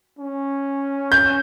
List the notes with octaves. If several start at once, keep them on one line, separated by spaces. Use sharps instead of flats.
C#4
G6